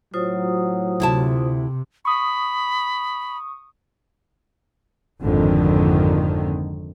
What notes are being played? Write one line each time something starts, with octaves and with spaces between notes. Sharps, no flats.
A2 F#3 F4 C5 D#6
D2 C3 E4 A5
B5 C#6 D#6
G#1 F2 D3 D#3